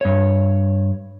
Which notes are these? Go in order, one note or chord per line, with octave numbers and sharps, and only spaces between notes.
G2 C#5